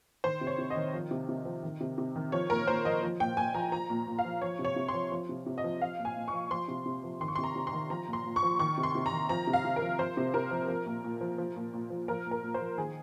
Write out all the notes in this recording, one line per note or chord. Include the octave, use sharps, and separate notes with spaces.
D#3 C5
C3
C#5
C3
D#5
D#3
F3
C3
C3
F3
D#3
C3
C3
D#3
F3 C#5
A#2 A#4
A#2 C5
F3 D#5
F3
A#2 G5
A#2 G#5
F3 A#5
F3 A#5
A#2
A#2
F5
F3
F3 C#5
C3
C#5
C3
C6
F3
F3
C3
C3
D#5
F3
F3 F5
A#2
G#5
A#2
C#6
F3
F3 C6
C3
C3
F3
D#3 C6
C#6
C3 C6
A#5
C3
C6
D#3
F3 A#5
A#2
C6
A#2
C#6
F3
D#3 C#6
C3
C6
C3
A#5
D#3
F3 A#5
C3
F5
C3
A#4
F3
F3 C5
C3
C3 A#4
F3
F3
A#2
A#2
F3
F3
A#2
A#2
F3
F3 A#4
A#2
A#4
A#2
C5
F3
D#3 G#4